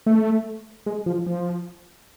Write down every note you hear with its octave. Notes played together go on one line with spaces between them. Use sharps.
A3
G#3
F3
F3